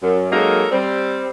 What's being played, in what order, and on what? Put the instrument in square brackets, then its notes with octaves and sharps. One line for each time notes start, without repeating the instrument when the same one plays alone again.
[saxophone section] F#2
F#3 G#3 A#3 D#4 A4 A#4
G3 C4